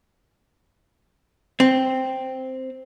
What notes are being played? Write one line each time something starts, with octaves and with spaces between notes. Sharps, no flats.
C4